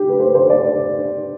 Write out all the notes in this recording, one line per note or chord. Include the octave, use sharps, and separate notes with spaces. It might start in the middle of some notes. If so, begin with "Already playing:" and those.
Already playing: G4
B4
C5
C5
D5